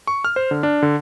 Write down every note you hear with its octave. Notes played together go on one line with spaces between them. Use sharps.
C#6
F6
C5
D3
D4
D3